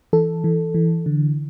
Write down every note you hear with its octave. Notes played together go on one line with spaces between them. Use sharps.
E3 A4
E3
E3
D3